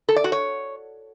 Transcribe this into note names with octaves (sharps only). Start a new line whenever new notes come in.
A4
D5
F#4
C#5